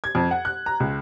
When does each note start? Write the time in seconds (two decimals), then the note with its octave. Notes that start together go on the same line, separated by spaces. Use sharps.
0.04 G#6
0.15 F2
0.31 F#5
0.45 F#6
0.66 A#5
0.80 C#2